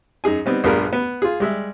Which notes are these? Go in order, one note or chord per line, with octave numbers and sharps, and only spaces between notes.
F#2 D#4 G#4 G#5
G3 B3 C4 D#4
A#1 G2 B3 F4 G#4 A#4
B3
F4 G#4
G3 G#3 E5